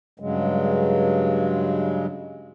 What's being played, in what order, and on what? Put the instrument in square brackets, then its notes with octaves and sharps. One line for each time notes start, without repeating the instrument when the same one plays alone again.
[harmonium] G2 C#3 F#3 G#3